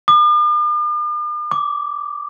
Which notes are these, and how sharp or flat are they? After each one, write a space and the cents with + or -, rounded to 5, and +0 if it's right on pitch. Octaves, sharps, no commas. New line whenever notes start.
D6 +45
D6 -15